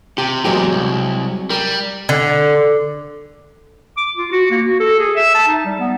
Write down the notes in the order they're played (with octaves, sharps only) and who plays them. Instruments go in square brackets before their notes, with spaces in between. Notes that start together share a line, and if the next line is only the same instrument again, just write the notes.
[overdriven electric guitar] C3 [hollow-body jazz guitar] G4
[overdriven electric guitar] E2 A#2 [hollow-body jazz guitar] F#3 G#3 G4
[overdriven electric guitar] C2
[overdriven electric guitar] G3 [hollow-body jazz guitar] A#4
[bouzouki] D3
[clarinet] D6
F4
F#4
A#3
F#4
A4
G#4
E5
A5
D#4
G3
B3